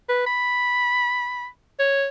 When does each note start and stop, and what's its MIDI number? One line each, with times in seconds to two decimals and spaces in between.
0.08 0.26 71
0.26 1.47 83
1.79 2.07 73